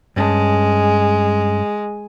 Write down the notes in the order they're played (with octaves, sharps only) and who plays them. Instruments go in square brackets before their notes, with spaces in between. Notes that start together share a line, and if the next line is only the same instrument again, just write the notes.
[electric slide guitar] G2 C#4 A5 [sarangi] G#3